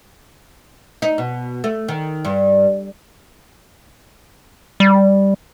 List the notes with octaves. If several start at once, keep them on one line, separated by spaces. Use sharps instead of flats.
D#4
B2
A3
D#3
G2
G3